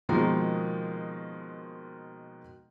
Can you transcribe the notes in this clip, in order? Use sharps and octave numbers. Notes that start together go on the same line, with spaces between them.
B2 D#3 F3 G#3 A#3 D#4